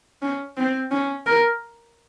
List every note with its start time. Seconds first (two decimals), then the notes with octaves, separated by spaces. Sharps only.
0.22 C#4
0.57 C4
0.91 C#4
1.26 A#4